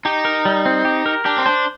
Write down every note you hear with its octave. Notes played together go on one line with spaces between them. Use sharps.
D#4 G4
A#4
G3
C4
G4
A#4
D4 G4
C4
D4 C5